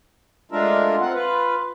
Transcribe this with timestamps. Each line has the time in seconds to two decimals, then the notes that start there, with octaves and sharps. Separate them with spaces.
0.52 G#3 A3 D4 F4 A#4 E5
1.00 C4 F4 F#5
1.14 F4 B4